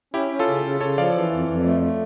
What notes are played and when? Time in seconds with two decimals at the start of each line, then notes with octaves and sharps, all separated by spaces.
0.14 C#4 E4 G4
0.31 C#4
0.39 F4 A4
0.47 C#3
0.64 C#3
0.81 C#3 A4 C#5
0.98 F3 D5 F5
1.15 E3
1.31 F2
1.48 F2
1.65 A3
1.81 A3